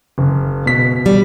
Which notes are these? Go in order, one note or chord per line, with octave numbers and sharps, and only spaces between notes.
F#1
B2 B6
G3